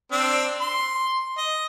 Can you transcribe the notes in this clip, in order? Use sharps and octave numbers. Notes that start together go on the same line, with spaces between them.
C4 D4 E6
C6
D#5